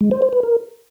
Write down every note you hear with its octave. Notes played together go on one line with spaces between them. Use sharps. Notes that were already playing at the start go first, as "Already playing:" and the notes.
G#3
C5
C5
B4
A#4